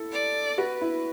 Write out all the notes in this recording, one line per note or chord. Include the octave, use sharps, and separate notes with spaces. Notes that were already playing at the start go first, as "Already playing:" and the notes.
Already playing: E4 A4
D5
F#4 B4
E4